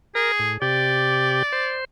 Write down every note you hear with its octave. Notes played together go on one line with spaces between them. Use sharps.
G#4 A#4
A2
C3 G4 D5
C5